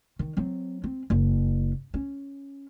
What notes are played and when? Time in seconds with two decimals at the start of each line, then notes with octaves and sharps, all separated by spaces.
0.19 D#3
0.37 F#3 C4
0.84 C4
1.10 F#1
1.94 C#4